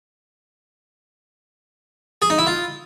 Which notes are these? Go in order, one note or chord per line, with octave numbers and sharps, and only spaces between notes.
G#4
D#4
E4
F4